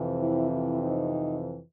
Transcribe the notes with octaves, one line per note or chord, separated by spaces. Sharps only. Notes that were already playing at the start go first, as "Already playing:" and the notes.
Already playing: F2 C3 E3
E4
E4
D#4